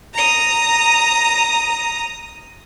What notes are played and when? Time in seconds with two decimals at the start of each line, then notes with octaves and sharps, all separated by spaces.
0.13 A#5 D#6